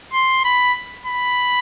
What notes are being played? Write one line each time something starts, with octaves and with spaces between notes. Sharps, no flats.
C6
B5
B5